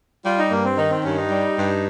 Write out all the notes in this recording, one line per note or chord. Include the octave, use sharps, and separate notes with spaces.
G3 F4
D#4
G2 A#3
C4
D#3 D#4
C4
G2 C#4
D#4
G3
G2